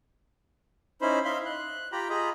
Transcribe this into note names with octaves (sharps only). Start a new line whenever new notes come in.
C#4 D#4 E4 C5 B5
D#4 E5 F5 B5 C6
F#6
F4 G4 G5 A#5 B5
F4 G#4 D#5 A#5 B5